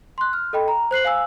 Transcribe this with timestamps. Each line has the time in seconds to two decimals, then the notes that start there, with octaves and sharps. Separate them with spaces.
0.18 C6 F#6
0.33 F6
0.53 A4 D#5 G5 B5
0.68 A#5
0.91 C5 F#6 C7 F#7
1.05 F5 G#5 E6